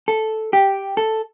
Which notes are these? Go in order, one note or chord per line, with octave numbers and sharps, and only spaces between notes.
A4
G4
A4